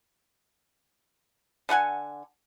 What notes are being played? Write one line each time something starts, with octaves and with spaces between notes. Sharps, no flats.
D3 A3 F#5 G#5